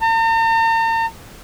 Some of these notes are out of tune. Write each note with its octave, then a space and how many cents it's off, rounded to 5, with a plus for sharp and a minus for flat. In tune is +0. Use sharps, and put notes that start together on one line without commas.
A#5 -45